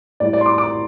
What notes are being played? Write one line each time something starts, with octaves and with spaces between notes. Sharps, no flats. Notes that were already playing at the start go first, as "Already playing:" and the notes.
A2 G3 D5
D5
C6
D6
D6